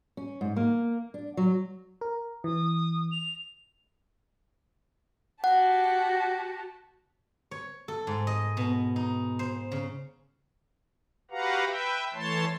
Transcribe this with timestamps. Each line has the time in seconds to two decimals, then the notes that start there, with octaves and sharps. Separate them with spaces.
0.17 C#4
0.41 G#2
0.56 A#3
1.14 D4
1.37 F#3
2.01 A#4
2.44 E3 D#6
3.12 F7
5.44 F#4 G4 F#5 A5
7.51 C#5
7.88 A4
8.07 G#2
8.27 D#5
8.57 B2
8.96 D#4
9.39 C5
9.72 C#3
11.31 F#4 G4 B4 F5 F#5 A#5
11.66 B4 E5 G5
12.14 E3 A3 C#5 A5 C6